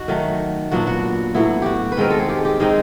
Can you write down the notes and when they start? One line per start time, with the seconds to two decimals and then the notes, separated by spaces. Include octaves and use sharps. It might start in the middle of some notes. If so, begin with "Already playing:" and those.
Already playing: D#4 F#4
0.08 D#3 F#3 A3
0.71 A#2 F#3 B3 D4 F#4
0.87 F#4
1.34 A2 F#3 B3 E4
1.62 F#4 G4
1.92 B4
1.97 D#3 G#3 C4 A#4
2.10 A4
2.19 G#4
2.29 G4
2.45 G4
2.60 D#3 G#3 C4 D#4 G#4